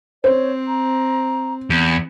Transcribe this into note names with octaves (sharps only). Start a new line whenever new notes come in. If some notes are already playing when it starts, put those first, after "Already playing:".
C4 C5 C#5
A#5
E2